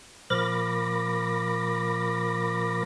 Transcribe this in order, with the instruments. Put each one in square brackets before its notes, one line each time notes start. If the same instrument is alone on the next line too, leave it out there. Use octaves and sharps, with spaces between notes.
[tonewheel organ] A#2 F3 A#4 B5 D6 A#6